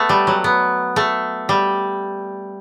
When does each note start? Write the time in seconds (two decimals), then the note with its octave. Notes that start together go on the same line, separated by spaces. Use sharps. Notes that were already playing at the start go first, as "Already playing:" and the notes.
Already playing: A3 B3
0.09 G3
0.27 F#3
0.44 B3
0.96 A3
1.49 G3